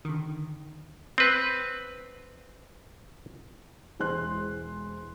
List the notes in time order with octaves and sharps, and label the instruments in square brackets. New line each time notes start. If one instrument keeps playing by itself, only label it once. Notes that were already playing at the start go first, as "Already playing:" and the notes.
[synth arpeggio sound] D3 D#3
[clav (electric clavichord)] C4 B4
[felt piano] E1 E3 G#3 C5 C6 F#6